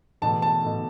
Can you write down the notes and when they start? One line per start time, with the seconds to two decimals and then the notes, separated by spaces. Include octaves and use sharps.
0.22 E2 B2 A3 A5
0.42 A5
0.64 B2 A3